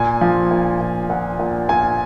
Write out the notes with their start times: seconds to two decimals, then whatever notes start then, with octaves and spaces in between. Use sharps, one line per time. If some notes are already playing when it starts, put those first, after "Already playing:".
Already playing: A#2 G#5
0.21 F3
0.51 A#2
0.80 A#2
1.09 A#2 F#5
1.39 A#2
1.69 A#2 G#5